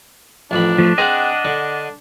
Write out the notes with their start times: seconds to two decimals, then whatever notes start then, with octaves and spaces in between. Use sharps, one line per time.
0.51 A1 F2 D4 B5
0.78 F3 A3
0.98 C4 G#4 C5 D#5 F#5
1.45 D3